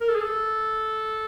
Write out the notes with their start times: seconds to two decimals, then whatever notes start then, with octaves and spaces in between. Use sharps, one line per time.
0.01 A#4
0.08 A4
0.15 G#4
0.22 A4